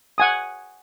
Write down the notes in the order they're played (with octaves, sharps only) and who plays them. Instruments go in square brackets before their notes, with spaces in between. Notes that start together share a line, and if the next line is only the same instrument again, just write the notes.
[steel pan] F#5 G#5 D#6